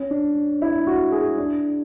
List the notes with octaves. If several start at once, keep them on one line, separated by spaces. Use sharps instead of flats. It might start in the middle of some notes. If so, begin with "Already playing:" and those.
Already playing: C#4
D4
E4
F#4
G#4
D4